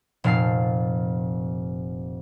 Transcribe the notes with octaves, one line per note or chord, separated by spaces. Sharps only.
F1 A#2 F5 A5 C7